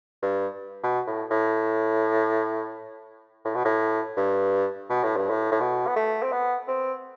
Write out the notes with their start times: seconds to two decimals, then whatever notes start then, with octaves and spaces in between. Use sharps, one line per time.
0.22 G2
0.83 B2
1.07 A2
1.31 A2
3.45 A2
3.55 B2
3.65 A2
4.17 G2
4.89 B2
5.03 A2
5.16 G2
5.30 A2
5.52 A2
5.60 B2
5.87 B3
5.96 A3
6.23 C4
6.32 B3
6.68 C4